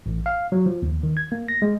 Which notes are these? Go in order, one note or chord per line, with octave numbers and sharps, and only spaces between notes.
A1
F5
F#3
F3
D#2
D#3
G#6
A#3
A#6
G#3